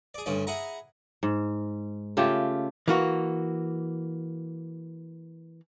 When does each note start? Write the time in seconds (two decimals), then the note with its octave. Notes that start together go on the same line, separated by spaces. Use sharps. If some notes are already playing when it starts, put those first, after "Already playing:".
0.14 G#4 D5
0.26 D2 G2 C#4 D5
0.47 E4 G#4 F#5 A#5
1.23 G#2
2.17 C#3 A3 F4 G4
2.88 E3 A#3 F#4